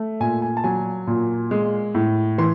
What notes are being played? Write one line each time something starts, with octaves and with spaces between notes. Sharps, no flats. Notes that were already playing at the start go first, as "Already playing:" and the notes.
Already playing: A3
A#2 G#5
G#5
A5
F#3 G#5
A#2
G#3
A2
E3 C6